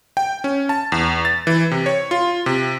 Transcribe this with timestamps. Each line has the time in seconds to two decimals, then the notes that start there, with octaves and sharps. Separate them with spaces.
0.17 G5
0.44 C#4
0.69 A5
0.92 E2
1.25 A6
1.47 E3
1.71 C3
1.86 C#5
2.11 F4
2.46 C3